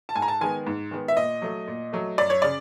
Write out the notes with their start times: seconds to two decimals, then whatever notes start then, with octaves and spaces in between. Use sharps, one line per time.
0.09 A5
0.16 G#2 G#5
0.22 A#5
0.28 A5
0.41 D#3 G#3 B3 G#5
0.67 G#2
0.91 D#3 G#3 B3
1.08 E5
1.17 A#2 D#5
1.42 F#3 A3
1.67 A#2
1.93 F#3 A3
2.18 F#2 D5
2.30 C#5
2.42 C#3 D5